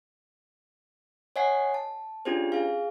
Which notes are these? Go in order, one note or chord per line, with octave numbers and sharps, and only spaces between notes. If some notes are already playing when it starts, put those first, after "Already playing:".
C#5 D#5 F#5 G#5 C7
A5
C#4 D4 F4 G4 G#4 C5
G#4 F5